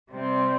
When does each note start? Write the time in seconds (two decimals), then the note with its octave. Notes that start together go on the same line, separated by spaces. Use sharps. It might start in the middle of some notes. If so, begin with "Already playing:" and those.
0.11 C3 G3 C4